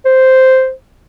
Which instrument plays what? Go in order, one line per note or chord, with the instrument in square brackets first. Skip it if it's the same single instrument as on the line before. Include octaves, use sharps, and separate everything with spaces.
[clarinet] C5